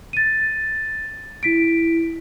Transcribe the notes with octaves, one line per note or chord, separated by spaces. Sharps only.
A6 D#7
E4 B6 D7